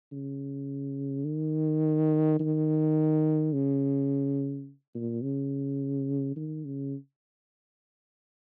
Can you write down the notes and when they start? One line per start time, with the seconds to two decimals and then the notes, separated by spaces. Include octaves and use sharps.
0.12 C#3
1.26 D#3
2.40 D#3
3.53 C#3
4.95 A#2
5.23 C#3
6.36 D#3
6.65 C#3